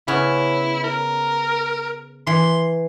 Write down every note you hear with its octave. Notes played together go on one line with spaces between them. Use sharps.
C#3 B3 C#4 E4
A#4
E3 C6